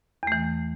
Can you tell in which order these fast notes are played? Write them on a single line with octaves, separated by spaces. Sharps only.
E2 A3 E3